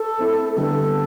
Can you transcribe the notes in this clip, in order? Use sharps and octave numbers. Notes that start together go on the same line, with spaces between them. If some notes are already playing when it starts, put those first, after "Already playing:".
Already playing: A4
A3 C4 E4
D3 G3 B3 D4 A4